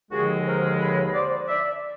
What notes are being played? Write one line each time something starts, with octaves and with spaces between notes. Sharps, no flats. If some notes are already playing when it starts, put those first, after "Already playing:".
D#2 D3 F3 G#3 F#4 G#4
A#4 C5
B4 C#5
C5 D5
D5 E5